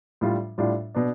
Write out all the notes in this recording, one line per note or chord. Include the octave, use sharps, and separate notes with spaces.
A2 G3 D4 F4
A2 G3 D4 F4
B2 B3 D4